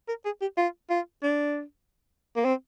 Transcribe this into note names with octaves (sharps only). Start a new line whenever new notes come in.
A#4
G#4
G4
F4
F4
D4
A#3
C4